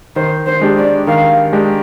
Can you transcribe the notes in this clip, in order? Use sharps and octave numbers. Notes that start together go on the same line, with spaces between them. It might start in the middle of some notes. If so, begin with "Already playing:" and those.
D#3 C5
C5
G#3 D4 G4
D5
D#3 F5
G#3 D4 G4